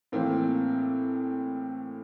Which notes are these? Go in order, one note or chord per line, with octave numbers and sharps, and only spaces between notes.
A2 E3 A#3 C4